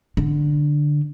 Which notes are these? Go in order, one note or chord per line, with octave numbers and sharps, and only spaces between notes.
D3